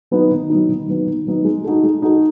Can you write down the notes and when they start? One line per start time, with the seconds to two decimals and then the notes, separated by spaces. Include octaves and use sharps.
0.11 F#3 B3 D#4
0.31 D#3
0.49 F#3 B3 D#4
0.69 D#3
0.88 F#3 B3 D#4
1.06 D#3
1.27 F#3 B3 D#4
1.45 G#3
1.64 D#4 F#4 A4
1.83 G#3
2.02 D#4 F#4 A4